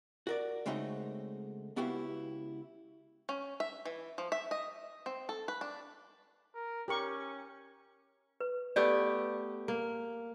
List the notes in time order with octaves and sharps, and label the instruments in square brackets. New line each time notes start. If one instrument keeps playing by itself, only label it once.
[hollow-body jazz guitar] F#4 A#4 D5
C#3 G#3 A3 C4 D#4 F#4
C#2 B3 E4 F#4 G4 F5
[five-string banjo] C#4
E5
E3
F3
E5
D#5
C4
A4
B4
D4
[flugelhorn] A#4
[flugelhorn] C#4 [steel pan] G4 A#4 C#6
[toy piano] B4
[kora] A3 B3 G4 [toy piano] D5
[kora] A#3